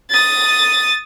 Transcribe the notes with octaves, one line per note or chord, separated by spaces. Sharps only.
D#6 A6